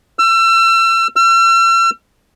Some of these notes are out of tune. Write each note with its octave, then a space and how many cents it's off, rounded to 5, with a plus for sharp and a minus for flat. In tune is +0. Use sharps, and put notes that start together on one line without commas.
E6 +35
E6 +45